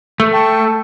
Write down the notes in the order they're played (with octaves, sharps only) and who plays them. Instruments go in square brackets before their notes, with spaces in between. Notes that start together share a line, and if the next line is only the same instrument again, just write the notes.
[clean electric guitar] A3
[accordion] G5 A5 C#6